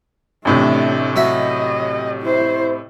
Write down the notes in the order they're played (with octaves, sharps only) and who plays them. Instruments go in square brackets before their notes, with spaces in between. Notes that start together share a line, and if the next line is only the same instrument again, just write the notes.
[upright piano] A1 A2 C3 [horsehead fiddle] A3 D4
[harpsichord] F#3 D#4 E5 [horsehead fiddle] D#5
[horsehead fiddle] E4 C5